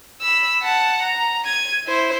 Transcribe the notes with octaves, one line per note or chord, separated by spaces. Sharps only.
B5 E6
F#5 A5
A#5
G#6 D#7
E4 C5